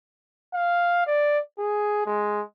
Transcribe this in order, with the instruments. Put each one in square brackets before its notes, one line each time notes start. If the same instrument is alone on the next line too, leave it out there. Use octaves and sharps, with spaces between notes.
[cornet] F5
D5
G#4
G#3